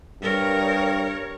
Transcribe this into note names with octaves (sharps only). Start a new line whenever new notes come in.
G2 A#4 C#5